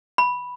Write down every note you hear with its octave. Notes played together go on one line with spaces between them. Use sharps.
B5